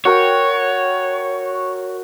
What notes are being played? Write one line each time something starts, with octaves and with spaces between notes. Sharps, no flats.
F#4 A#4 C#5 G5